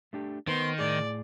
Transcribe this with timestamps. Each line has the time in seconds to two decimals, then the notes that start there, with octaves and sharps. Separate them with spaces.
0.13 A3 D4 G4
0.48 D#3 B3 B4 C5 C6
0.79 A2 G#4 D5